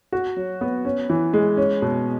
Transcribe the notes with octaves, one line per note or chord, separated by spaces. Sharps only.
F#4
F#3
B3
C#4
E3
G#3
C#4
B2